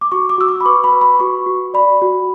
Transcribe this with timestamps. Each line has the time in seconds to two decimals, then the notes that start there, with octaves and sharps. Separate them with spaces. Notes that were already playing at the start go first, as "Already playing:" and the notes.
0.01 D6
0.12 F#4 C#6
0.29 D6
0.38 F#4 E6
0.48 D6
0.61 B5
0.66 B4 C#6
0.84 B5
0.93 B4
1.01 B5
1.20 F#4 C#6
1.46 F#4
1.74 D5 B5
2.02 F#4